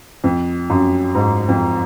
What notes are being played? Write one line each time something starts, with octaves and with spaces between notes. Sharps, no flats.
F2
F#2
G#2
F2